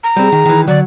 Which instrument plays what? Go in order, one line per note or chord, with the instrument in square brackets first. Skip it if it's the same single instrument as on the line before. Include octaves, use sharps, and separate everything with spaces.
[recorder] A#5
[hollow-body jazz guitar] G3 C4 [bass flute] G#4
[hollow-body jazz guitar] D#3
D#3 E3
[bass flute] D3 [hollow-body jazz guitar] F#3 [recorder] D5